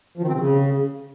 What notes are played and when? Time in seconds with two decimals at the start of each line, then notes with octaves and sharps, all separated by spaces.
0.18 F3
0.23 D#3
0.28 C4
0.33 C3
0.38 C#3